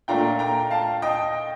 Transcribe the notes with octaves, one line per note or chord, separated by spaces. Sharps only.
A#2 A3 D4 F4 G5 A#5
G5 A#5
F5 A5
D#5 G5